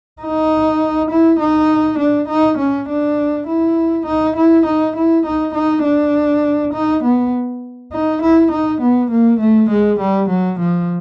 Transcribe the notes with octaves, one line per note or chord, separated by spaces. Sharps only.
D#4
E4
D#4
D4
D#4
C#4
D4
E4
D#4
E4
D#4
E4
D#4
D#4
D4
D#4
B3
D#4
E4
D#4
B3
A#3
A3
G#3
G3
F#3
F3